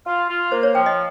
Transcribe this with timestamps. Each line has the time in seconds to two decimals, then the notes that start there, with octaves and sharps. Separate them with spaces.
0.06 F4
0.28 F4
0.52 A#3 C5
0.63 C#5
0.74 F3 G5
0.86 D#5